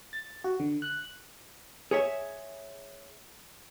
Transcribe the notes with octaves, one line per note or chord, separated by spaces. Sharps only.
A6
F#4
D3
F#6
G#4 C#5 E5